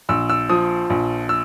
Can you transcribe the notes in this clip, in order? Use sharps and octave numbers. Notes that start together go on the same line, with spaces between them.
A#1 E6
E6
F3 D#6
A#1
E6